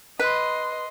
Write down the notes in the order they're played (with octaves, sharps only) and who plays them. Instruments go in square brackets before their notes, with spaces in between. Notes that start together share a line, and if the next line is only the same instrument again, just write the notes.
[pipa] B4 [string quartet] D#5 C6